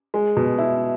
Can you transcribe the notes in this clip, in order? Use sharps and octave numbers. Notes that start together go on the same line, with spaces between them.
G#3
B2
E4